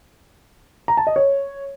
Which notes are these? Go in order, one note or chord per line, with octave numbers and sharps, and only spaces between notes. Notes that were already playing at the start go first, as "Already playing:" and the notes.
A#5
A5
D#5
C#5